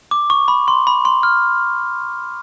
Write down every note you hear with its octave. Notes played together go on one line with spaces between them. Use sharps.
D6
C#6
B5
C6
B5
C6
F6